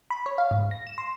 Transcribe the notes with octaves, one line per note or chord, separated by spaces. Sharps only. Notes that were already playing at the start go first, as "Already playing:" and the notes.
B5
C#5
F5
G#2
A#6
E7
C6